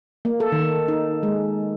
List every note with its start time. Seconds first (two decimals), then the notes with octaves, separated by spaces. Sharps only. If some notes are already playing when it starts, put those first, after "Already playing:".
0.25 A#3
0.40 A4
0.52 D#3
0.88 D#4
1.23 G#3